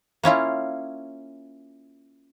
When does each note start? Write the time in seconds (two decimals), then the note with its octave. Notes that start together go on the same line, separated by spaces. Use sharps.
0.24 A#3 C#4 E4 F4